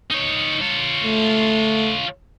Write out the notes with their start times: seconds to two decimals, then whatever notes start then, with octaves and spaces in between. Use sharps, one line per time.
0.11 D#4 C#5
0.61 F4 C#5
1.04 A3